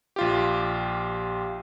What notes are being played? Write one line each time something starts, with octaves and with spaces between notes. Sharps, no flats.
A#1 F4 G4